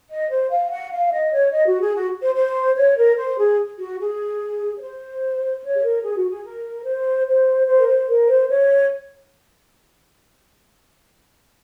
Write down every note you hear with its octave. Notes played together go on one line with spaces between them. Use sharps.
D#5
C5
F5
F#5
F5
D#5
C#5
D#5
F#4
G#4
F#4
C5
C5
C#5
A#4
C5
G#4
F#4
G#4
C#5
C5
C#5
G#4
A#4
G#4
F#4
G#4
A#4
C5
C5
C5
A#4
C5
A#4
C5
C#5